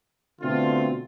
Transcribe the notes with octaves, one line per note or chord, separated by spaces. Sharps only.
B2 D3 A3 C4 F4